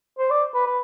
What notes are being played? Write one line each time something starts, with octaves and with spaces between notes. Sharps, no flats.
C5
D5
B4
B4